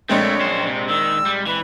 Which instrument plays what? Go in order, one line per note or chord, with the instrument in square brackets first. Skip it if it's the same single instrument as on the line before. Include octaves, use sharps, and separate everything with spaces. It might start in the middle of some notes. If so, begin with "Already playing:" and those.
[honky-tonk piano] A#1 G#3 C4 [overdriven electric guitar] A3 [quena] C#5
[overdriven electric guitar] F#2 C5
C3
[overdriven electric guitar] D#3 [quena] E6
[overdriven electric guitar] G3
[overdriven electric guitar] E3 [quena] B4